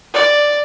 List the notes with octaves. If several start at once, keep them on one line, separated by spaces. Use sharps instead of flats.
D5